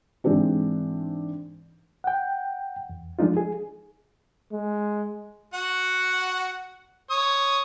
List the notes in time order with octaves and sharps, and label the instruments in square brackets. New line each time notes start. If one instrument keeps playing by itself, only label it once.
[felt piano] G#2 E3 G#3 C4 D4
[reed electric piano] F#5 G5
E2
F3 G#3 D4 D#4 F4
G#4
[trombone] G#3
[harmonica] F#4 F#5
C#5 D#6